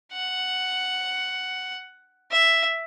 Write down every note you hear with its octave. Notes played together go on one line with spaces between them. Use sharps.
F#5
E5